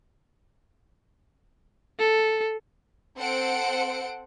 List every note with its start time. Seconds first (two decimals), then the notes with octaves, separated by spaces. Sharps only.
1.99 A4
3.18 C4 A4 C5 F#5 C#7 D7